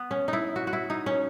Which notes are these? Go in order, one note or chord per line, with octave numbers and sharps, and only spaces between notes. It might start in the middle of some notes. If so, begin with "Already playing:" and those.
Already playing: B3
C#4
D#4
E4
F#4
F#4
E4
D#4
C#4